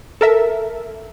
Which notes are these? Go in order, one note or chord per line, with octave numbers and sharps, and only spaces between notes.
A4 A#4 E5